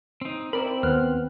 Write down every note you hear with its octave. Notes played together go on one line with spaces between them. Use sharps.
C4 D#4
C4 E4 A#4 D5 B5
D#2 B3 F6 F#6